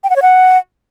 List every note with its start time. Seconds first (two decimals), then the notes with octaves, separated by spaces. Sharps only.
0.04 G5
0.10 F#5
0.16 C#5
0.22 F#5